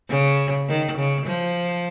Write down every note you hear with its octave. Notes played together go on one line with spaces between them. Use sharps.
C#3
D#3
C#3
F3